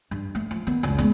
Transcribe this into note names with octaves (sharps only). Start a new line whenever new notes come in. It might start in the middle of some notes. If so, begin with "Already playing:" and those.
G2
A3
F3
D#3 B3
F#1 C#2
G#3 B3